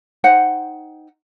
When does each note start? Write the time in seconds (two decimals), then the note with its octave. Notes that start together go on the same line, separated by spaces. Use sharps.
0.24 D#4 C5 F#5 G5